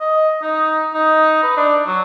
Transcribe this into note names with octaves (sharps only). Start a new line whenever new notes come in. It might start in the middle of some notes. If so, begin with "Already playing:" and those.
D#5
D#4
D#4
B4
D4
F#3